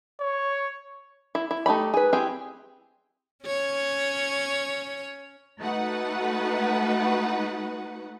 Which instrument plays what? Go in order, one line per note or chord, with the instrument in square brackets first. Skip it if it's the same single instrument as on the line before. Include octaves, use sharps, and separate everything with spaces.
[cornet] C#5
[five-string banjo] E4
E4
A3 D#4 G4 B5
G#4 B4
C4 E4 G4 G#4 G5
[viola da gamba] C#4 C#5
[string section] A3 D#4 F#4 B4 F#5